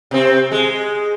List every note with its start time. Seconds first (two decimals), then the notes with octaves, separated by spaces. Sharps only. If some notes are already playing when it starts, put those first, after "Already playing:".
0.11 C3 C4
0.52 G#3